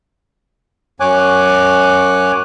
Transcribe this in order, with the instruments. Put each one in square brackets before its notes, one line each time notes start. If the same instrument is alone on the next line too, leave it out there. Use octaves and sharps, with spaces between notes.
[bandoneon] F#2 C#5 G#5 D6 F#6